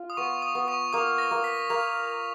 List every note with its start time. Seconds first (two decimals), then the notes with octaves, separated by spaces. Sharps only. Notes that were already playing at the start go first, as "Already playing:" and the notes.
Already playing: F4
0.10 D#6
0.17 B3 C#6
0.42 D#6
0.55 B3
0.68 C#6
0.93 A#3 D#6
1.18 A#6
1.31 A#3
1.44 B6
1.70 A#3 F7